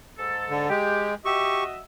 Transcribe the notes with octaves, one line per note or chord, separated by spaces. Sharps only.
G#2 A4
D3
G#3 G4
F#4 G4 D#5 E5 C#6